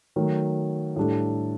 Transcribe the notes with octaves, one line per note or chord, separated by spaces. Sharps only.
D#3 F#3 A3
A2 G3 D4 A4